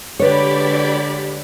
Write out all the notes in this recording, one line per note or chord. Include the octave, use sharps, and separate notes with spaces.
D3 G#3 G4 B4 C#5 D5 B5